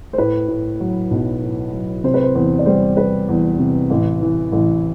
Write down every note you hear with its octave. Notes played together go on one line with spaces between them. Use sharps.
C5
A2 B4
A2
F#3
B1
A2
F#3
C3 C5
B4
C5
E2 C5
D5
G3 C5
G3 B4
E2
C3
A1
E3
A1